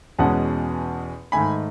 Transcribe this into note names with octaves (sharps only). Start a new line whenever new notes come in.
E2 B2 G#3 C#4 F#5 A5
G#2 D#3 A3 G#5 B5